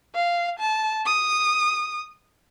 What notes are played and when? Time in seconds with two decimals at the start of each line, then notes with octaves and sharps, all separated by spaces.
0.14 F5
0.59 A5
1.05 D#6